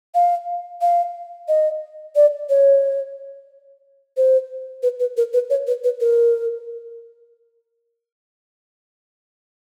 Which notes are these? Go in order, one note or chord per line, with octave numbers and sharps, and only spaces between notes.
F5
F5
D#5
D5
C#5
C5
B4
B4
A#4
B4
C#5
B4
B4
A#4